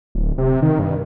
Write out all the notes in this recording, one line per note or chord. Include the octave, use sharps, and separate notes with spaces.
D1
C3
D#3
G2